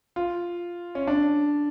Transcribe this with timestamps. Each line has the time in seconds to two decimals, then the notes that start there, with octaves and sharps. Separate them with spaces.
0.16 F4
0.95 C#4
1.07 D4